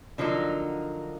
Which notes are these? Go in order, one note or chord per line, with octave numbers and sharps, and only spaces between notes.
D3 F3 F#3 A#3 D#4